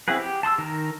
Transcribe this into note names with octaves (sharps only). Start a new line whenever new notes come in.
C4 E4 F#4 G#4 B4
G4
A5 C6 D#6 E6
D#3 A#4